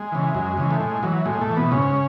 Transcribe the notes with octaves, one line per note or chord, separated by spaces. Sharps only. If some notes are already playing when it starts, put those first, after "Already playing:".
Already playing: G#3
C#3 E3
F#2
C#3 E3
A3
A2 G#3
E3 F#3
A2 G#3
A2 A3
E3
B2 B3
G#2 C#3 C#4